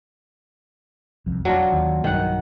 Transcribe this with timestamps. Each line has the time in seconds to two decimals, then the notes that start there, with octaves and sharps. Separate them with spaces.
1.26 C2 F2
1.45 E1 F#3 D4 F4
1.72 D#2
2.04 B1 G2 D#3 F#5